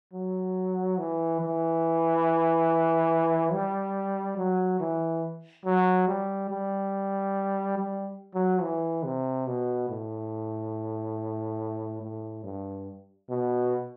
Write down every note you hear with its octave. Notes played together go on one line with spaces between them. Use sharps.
F#3
E3
E3
G3
F#3
E3
F#3
G3
G3
G3
F#3
E3
C3
B2
A2
A2
G2
B2